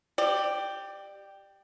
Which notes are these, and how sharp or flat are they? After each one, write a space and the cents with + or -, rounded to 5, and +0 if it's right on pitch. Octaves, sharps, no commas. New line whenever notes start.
G4 +0 D5 +30